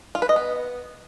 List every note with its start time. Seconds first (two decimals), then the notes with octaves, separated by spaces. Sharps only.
0.15 F4
0.22 B4
0.29 D#5
0.36 B3